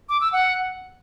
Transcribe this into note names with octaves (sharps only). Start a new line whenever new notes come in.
D6
E6
F#5